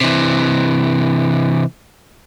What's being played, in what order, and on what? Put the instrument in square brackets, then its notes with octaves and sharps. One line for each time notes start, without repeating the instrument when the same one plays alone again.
[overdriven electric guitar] C3 E3